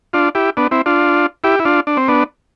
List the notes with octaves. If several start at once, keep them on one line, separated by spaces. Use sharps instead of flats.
D4 F4
E4 G4
B3 D4
C4 E4
D4 F4
E4 G4
E4
D4 F4
D4
C4
B3 D4